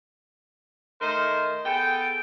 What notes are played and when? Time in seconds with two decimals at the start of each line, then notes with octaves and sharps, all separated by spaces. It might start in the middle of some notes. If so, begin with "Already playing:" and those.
1.02 D#3 A3 D#4 A#4 C5
1.66 B3 G#4 A4 G5